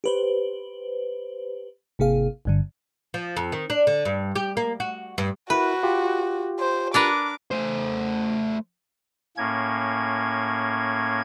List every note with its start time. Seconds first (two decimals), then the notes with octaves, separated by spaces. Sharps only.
0.04 G4 B4 C5
1.99 G#1 C3 A#3 G#4 F5
2.45 G1 G2 D3
3.14 F3
3.37 F2
3.52 D#3
3.70 D4
3.87 D3
4.05 G2
4.35 G4
4.57 A#3
4.80 F#4
5.18 G2
5.50 E4 F#4 A#4 B4
5.83 F4 G4
6.59 C5
6.94 D4 A#4 B4 D6
7.51 A3 C5
9.37 A2 A#3 C#4 G#6